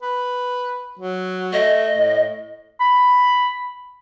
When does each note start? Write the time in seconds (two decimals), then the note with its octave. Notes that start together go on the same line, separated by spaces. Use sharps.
0.02 B4
0.99 F#3
1.53 A3 D#5
1.96 A2
2.80 B5